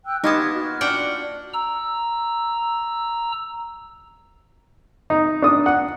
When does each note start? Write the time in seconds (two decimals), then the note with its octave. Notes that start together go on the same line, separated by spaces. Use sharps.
0.05 G5 E6 F#6
0.24 A#3 B3 D#4 G4 D#5 A5 C6 G#6
0.53 F4 F#4 F6
0.81 D4 F#5 G5
1.53 A#5 E6
5.10 D#4
5.42 D4 D#6
5.66 F#5